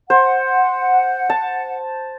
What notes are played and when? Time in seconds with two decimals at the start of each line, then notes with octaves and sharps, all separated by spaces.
0.10 C5 F#5
1.30 A5